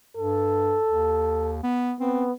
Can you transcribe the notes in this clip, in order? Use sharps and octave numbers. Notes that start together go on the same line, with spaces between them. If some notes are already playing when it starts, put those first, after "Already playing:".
G2 A4
D#2
B3
B3 C4